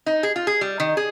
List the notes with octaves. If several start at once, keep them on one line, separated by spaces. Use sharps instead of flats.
D#4
G#4
F4
G#4
G3
D#3
G#4